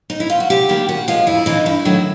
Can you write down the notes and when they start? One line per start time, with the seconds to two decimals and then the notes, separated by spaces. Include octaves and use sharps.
0.10 D#4
0.20 E4
0.30 F4
0.40 F#4
0.50 C3 G4
0.69 D#3 G3 A#3
0.89 A#2 F#4
1.08 F3 G#3 F4
1.27 F2 E4
1.46 C#3 E3 D#4
1.66 G2 E4
1.85 D#3 F#3 A3